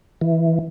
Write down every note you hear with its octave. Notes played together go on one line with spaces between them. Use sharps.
E3